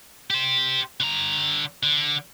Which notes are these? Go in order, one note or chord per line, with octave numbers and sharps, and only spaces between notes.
G4 C5
D3 A#5
D3